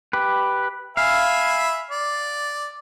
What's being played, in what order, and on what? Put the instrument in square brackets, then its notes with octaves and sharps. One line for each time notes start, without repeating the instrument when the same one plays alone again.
[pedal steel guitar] G4 B4
[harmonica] E5 G#5 B5 [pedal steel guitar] F5
[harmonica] D5